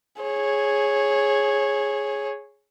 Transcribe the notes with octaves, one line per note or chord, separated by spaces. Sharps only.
G#4 C#5